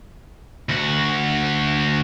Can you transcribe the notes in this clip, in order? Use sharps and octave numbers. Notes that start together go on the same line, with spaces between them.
D2 F#4